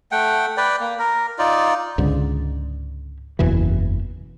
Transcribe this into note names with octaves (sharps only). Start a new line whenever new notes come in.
A3 F#5 G5
B4 D5 G5
A#3
A#4
D#4 F4 D5
C#2 G#2 D3
F#1 E2 B2 E3